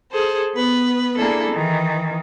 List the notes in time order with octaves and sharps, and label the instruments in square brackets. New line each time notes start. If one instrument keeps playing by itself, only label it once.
[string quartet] G#4 A4 C5
B3 B4
A#3 D4 E4 G#4 A4
D#3 E3